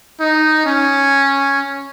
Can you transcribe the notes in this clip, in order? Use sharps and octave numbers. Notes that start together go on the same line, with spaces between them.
D#4
C#4